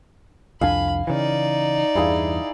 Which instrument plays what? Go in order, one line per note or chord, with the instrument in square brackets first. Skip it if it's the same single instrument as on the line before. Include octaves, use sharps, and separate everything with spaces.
[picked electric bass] C2 F2 D4 [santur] F5 G#5 [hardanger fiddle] B5
[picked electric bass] C#3 E3 [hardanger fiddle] D#4 D5
[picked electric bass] E2 G2 [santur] E4 G#4 F5